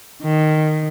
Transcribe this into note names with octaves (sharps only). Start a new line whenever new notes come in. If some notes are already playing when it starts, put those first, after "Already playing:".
D#3